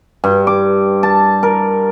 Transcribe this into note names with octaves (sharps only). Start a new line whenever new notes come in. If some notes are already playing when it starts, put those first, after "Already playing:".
G2
D6
A5
A#4